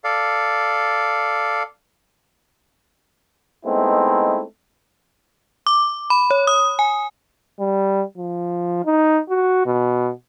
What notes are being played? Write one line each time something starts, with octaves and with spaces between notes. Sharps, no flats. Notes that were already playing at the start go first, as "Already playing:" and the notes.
A4 D5 F5
G#3 A3 B3 C4 D#4 E4
D6
B5
C#5
D#6
G#5
G3
F3
D#4
F#4
B2